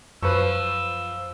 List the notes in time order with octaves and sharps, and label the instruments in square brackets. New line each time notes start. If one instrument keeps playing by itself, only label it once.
[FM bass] F#2 [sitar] F3 [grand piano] B4 C#6 [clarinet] E6